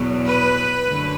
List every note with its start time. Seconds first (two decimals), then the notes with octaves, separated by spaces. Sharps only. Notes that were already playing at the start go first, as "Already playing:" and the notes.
Already playing: E2 B2 F#3
0.25 B4
0.86 F#2 D3 A3